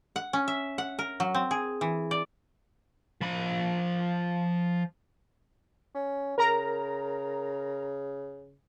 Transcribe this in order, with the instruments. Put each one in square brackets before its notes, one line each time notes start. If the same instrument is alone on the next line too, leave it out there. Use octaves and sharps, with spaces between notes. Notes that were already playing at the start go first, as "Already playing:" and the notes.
[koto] F#5
C#4
E5
F#5
A#4
F#3
C4
G#4
E3
D5
[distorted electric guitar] F3 B5
[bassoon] C#4
[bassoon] C#3 [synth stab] A#4 A#5